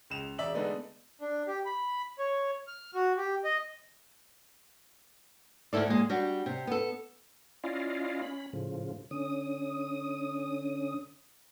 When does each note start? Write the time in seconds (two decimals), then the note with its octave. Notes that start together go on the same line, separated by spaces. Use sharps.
0.10 C#2 E7 F7
0.39 E1 D5 E5 F#7
0.55 D3 G#3 A3 B3 D4 D#4
1.21 D4
1.47 G4
1.66 B5
2.19 C#5
2.68 F6
2.94 F#4
3.17 G4
3.44 D#5
5.73 D2 C#3 E4 A4 D5
5.88 A#2 G#3
6.10 G3 D4 F#4
6.46 C3
6.67 B3 A4
7.64 C#4 E4 F4 D5 D#5 F5
8.22 C#4 B5
8.53 A2 C#3 F3
9.11 D3 C#4 D#6